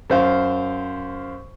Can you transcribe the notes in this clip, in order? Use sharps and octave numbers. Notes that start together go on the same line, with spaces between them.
F#2 C5 F5